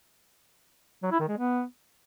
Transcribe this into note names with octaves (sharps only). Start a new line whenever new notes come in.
F#3
E4
D#3
G#3
B3